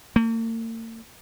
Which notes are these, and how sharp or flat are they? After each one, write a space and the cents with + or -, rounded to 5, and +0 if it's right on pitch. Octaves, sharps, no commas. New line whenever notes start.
A#3 -45